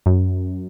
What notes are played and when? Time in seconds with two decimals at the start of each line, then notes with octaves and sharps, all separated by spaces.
0.06 F#2